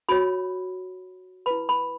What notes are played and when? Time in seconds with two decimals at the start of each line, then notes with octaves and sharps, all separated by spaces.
0.09 F#4 C#5 B5
1.46 E4 B4 B5
1.69 B5